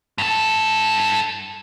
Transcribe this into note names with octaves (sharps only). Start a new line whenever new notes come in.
G2 A4